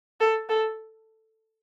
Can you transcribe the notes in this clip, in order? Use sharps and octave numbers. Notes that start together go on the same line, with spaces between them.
A4
A4